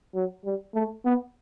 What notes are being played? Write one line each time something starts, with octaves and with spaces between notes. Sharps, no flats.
F#3
G3
A3
B3